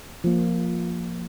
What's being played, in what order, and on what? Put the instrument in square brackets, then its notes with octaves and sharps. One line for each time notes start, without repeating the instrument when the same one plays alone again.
[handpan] F3 A#3